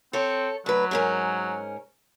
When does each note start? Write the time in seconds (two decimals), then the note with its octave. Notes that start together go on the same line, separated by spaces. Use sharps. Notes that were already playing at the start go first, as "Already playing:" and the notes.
0.13 C4 A4 C#5
0.66 D2 F#3 B4
0.91 G#2 C#4 A#4